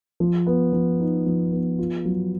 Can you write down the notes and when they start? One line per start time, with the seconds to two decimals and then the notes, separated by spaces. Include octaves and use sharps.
0.20 F3
0.47 B3
0.73 F3
1.00 D#4
1.26 F3
1.53 B3
1.79 F4
2.05 F#3